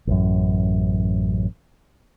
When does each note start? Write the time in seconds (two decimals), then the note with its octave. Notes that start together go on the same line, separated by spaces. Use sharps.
0.07 A1 F#2